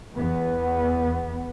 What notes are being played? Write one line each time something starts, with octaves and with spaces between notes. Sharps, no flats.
E2 B3